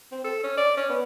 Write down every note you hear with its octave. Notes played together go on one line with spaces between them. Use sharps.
C4
A4
C#4
D5
C#4
B3